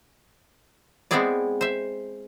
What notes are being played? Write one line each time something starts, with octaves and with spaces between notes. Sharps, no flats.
G#3 B3 C4 E4 G#4 D5
C5 E5